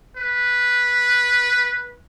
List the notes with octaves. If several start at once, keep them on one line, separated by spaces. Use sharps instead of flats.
B4